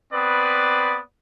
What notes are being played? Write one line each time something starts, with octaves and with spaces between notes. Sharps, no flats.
B3 C4 B4 D5 D#6